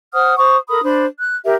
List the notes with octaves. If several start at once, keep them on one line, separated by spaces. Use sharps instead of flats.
C5 F#5 D#6 F6
C5 C#6 D#6
A4 A#4 B5 D#6
D4 C5 B5
F#6
G4 A#4 E5